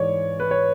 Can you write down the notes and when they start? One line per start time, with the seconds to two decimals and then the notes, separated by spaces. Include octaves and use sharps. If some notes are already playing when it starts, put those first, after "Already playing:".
Already playing: G#2 E3 G#3 C#5 D5
0.40 B4
0.51 C#5